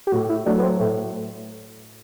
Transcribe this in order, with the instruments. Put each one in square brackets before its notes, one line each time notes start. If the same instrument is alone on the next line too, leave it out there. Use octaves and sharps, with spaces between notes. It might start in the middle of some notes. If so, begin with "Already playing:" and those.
[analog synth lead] G4
[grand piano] A2 [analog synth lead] F#4
[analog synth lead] E4
[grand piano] F#3 A3 [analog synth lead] D4
[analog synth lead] B3
C4
[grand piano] A2 [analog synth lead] A3